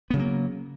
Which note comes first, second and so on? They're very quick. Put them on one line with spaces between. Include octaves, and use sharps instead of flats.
B3 C#3 F#3 A#3